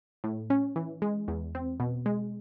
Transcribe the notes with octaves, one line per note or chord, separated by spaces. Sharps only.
A2
C#4
E3
G#3
E2
C4
B2
G#3